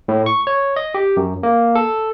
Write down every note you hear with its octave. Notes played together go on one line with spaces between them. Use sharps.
A2
C#6
C#5
D#5
G4
F#2
A#3
A4